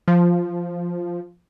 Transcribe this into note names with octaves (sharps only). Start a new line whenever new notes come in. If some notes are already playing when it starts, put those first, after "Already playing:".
F3